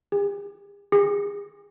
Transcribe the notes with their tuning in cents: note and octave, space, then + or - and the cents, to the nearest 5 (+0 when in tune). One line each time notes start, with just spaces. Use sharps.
G#4 -45
G#4 -35